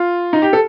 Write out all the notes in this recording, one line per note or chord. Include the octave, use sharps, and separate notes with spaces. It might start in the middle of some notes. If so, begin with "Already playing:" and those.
Already playing: F4
D#4
G4
A4